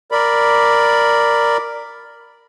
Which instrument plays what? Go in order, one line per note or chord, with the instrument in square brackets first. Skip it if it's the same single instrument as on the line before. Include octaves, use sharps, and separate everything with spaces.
[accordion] A#4 D5 B5